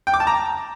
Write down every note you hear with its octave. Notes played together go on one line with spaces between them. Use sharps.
G5
D6
A5
A#5